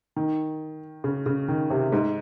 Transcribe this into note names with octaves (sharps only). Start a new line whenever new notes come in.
D#3
C#3
C#3
D#3
C3
G#2